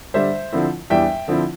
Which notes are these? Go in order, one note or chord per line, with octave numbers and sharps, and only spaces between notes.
D3 G3 D4 C5 E5
D3 F3 C4 E4
E2 E3 G3 D4 E5 G5
D3 F3 C4 E4